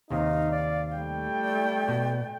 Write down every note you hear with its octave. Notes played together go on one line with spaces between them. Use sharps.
D#2 C3 D#3 D#4 F5
D5
G3 A3 G5
D5
B2